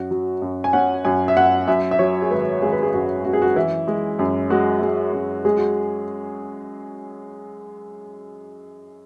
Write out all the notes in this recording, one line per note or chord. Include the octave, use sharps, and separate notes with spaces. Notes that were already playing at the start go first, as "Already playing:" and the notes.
Already playing: F#2 F#4
F#3
F#2
G#5
C#4 F#5
F#2 G#5
E5
F#2 F#5
F#2 E5
E5
F#3 C#5
G#4
G#1 B4
G#1 G#4
B4
G#4
F#2 F#4
F#2 F#4
G#4
F#4
E3 E4
G#3
F#2
G#3 F#4
G#3
F#2
G#3 G#4
F#4